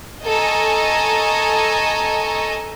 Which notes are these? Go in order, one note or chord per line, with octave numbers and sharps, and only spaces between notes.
A4 D#5 G#5 A#5 C#6